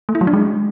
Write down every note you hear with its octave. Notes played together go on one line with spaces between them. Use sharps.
A3
E4
F#3
D4
G#3